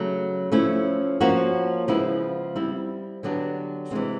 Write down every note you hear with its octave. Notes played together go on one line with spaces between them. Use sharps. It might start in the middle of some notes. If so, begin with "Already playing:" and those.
Already playing: C#3 F#3 A3
F3 A3 C#4 E4
F3 A#3 C#4 F#4
C#3 F3 G#3 B3 E4
G3 C4 E4
D3 F#3 B3 D4 G4
C3 E3 G#3 C4